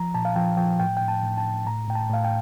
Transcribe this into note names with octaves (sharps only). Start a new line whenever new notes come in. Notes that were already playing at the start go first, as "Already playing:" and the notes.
Already playing: F3 A#5
A#2 A5
F5
F3 G5
F3 G5
A2 G5
A2 G5
A5
A2
A5
A2
A2 A#5
A2 G5
A5
A2 F5
G5